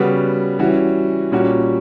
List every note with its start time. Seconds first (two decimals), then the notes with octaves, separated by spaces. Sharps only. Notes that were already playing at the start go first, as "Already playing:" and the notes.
Already playing: C#3 G3 B3 F#4
0.59 E3 G3 C#4 F#4
1.32 A#2 G3 C#4 F#4